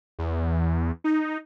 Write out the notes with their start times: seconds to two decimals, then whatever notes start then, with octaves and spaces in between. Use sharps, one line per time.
0.19 E2
1.04 D#4